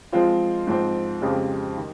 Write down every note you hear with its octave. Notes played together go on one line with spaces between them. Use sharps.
F3 G#3 C4 F4
G#2 F3 C4
F2 C#3 G#3 C4 G4
D#3